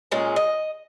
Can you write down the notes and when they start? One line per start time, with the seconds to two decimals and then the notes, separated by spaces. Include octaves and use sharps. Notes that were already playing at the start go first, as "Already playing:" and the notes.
0.11 A#2 G#3 C#4
0.36 D#5